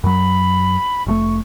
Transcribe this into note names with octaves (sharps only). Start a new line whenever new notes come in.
F#2 F#3 B5
F1 G#2 A3 C#6